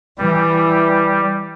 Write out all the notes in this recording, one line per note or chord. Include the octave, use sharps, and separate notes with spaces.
E3 G3